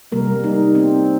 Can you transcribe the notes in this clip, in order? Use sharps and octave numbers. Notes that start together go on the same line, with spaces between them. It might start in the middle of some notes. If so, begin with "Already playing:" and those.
C3 G3 A#3 A#4
D#4
C4